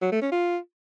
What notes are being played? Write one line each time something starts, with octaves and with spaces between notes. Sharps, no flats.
F#3
A3
C#4
F4